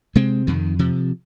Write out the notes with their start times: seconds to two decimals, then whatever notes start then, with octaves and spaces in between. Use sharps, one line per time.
0.16 C3 G#3 C4
0.47 F2 D#3
0.79 C3 F3